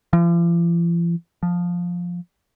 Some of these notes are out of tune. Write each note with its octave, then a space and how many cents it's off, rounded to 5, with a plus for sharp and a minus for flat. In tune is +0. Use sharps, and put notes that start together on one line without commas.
F3 -45
F3 +10